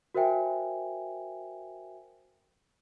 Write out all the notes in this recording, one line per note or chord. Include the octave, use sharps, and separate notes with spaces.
F#4 A#4 C5 E5 G5 G#5